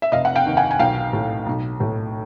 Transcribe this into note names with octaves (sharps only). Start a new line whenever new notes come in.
E5
F1 D#5 F5
F#5
F5 G5
D#2
F#5 G#5
G#5
B1 F5 G5
A2
B1
A2